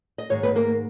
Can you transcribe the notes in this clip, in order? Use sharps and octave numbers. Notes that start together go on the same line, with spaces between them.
D#5
G#2 D#3 C#5
B3 B4
A#3 A#4